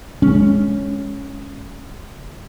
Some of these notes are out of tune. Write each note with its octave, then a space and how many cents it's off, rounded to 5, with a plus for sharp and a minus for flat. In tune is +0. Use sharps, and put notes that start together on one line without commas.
G#3 +0 C#4 +0